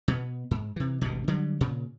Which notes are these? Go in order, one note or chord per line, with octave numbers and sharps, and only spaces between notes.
B2 B3
G#2
C3 E3
G#1 D2 G2 B2
D3 F#3 G3
A#2 C#3